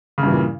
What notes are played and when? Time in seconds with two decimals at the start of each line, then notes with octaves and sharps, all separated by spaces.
0.18 C#3
0.22 G2
0.27 E3
0.32 A#2